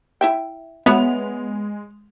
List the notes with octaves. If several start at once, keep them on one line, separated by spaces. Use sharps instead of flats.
E4 E5 G5
G#3 B3 F#4 C#5 E5 F7